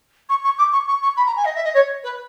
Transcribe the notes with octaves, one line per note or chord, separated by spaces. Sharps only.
C#6
C#6
D6
C#6
C#6
C#6
B5
A#5
G#5
D#5
E5
D#5
C#5
B4